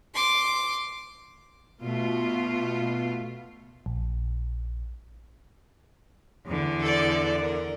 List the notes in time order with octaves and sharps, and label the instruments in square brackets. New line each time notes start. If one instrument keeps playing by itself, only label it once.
[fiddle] C6 D6
[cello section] B2 A3 F4
[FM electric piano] A#1
[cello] E2 D3
[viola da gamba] A4 D5
A#4